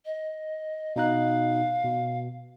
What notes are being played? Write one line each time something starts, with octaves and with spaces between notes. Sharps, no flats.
D#5
B2 D#4 F5 F#6
B2